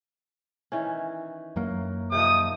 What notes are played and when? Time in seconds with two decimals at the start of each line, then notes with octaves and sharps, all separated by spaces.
0.72 D#3 E3 C#4
1.56 F#2 F#3 A#3
2.12 C3 D#3 F3 D#6